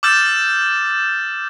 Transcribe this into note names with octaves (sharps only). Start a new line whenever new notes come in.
D6 E6 F6 G6 A6 E7